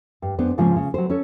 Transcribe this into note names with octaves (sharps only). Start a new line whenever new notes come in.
G2
F#2 B3 D4 C5
G#2 C#3 F3 G#3 A#3
C#3
F#3 C5
C#4 A4 C#5